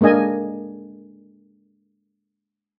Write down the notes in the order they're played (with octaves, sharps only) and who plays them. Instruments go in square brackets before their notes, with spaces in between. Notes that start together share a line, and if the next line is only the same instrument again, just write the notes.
[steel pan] G#3 A#3 D4 D#5 G#5